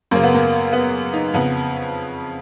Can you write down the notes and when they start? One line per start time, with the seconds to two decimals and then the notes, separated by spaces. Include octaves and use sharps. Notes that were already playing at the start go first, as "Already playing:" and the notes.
0.11 F#2 C#3 A#3
0.23 B3
0.35 A#3
0.73 B3
1.14 D#4
1.34 F2 C#3 B3